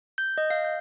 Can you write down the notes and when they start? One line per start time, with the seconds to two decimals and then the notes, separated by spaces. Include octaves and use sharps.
0.18 G6
0.38 D#5
0.50 F5
0.65 G6